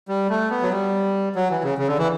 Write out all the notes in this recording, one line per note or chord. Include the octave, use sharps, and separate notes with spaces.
G3
A3
B3
F#3
G3
F#3
E3
C#3
C#3
D3
E3